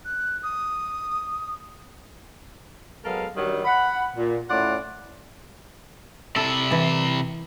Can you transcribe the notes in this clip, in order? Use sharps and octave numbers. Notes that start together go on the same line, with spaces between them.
F#6
D#6
F#3 G#3 B3 A4 A#4 F5
G2 D#3 F#3 G3
F#5 B5
A#2
A2 C#4 E4 F4 D5 F#5
C3 E4 A4
E3 A5